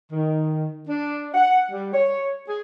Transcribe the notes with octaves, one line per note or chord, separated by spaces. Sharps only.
D#3
D4
F#5
G3
C#5
G#4